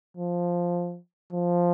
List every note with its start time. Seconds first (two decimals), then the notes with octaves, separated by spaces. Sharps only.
0.17 F3
1.33 F3